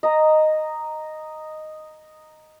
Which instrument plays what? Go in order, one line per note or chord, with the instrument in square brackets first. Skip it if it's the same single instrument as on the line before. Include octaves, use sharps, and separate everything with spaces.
[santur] D#5 A#5